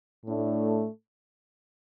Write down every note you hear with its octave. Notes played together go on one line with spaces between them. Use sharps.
A2 A3 D4